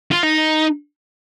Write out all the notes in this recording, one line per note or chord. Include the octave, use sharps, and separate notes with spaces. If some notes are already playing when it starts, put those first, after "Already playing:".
F4
D#4